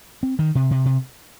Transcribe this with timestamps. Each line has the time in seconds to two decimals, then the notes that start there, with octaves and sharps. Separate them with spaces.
0.23 C4
0.39 D#3
0.55 C3
0.71 C3
0.85 C3